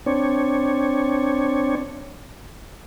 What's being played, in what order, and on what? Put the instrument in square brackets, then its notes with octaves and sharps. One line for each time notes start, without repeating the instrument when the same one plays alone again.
[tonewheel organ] C4 D4 C#5